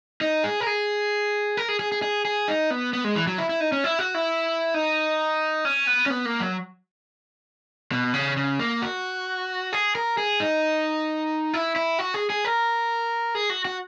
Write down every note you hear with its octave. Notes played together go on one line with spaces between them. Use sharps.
D#4
G#4
A#4
G#4
A#4
G#4
G#4
G#4
G#4
G#4
D#4
B3
B3
G#3
E3
F#3
E4
E4
D#4
C#4
E4
F#4
E4
D#4
C#4
B3
C#4
B3
A#3
F#3
B2
C#3
C#3
A#3
F#4
G#4
A#4
G#4
D#4
E4
E4
F#4
G#4
G#4
A#4
G#4
F#4
F#4